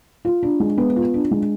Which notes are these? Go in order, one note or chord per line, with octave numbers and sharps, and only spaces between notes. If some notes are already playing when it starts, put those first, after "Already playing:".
F4
D4
G#3
B3
F4
D4
G#3